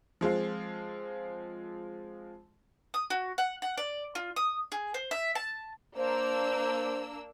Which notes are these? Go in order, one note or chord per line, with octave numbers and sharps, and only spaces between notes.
F3 G#3 C4 F4
D#6
F#4
F#5
F#5
D5
F4
D#6
G#4
C5
E5
A5
A#3 D4 C5 E6